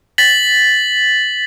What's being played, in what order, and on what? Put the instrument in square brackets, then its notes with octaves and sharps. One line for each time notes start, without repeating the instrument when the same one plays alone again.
[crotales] A6 B6 F#7